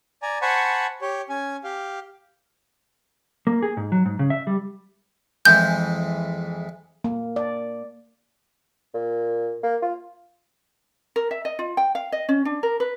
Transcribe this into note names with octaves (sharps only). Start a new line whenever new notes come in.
D5 G#5 A#5
C5 F#5 G#5 A5 B5 C#6
G4 C#5
C#4 G#5
G4 F5
A#3
G#4
G#2
F#3
G#2
C#3
E5
G3
F2 E3 G#3 G6
A#3
D5
A#2
A#3
F4
A#4
E5
D#5
F4
G5
F5
D#5
C#4
D4
A#4
B4